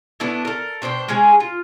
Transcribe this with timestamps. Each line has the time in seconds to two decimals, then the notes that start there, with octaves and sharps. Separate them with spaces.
0.20 A3 B3 D4 E4
0.45 A4 A#4
0.82 B2 D4 C5 G5
1.08 G#3 C#4 G#4
1.40 F4